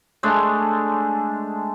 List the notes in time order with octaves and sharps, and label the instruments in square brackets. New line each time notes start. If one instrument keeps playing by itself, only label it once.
[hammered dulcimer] G#3 A3 D4 A4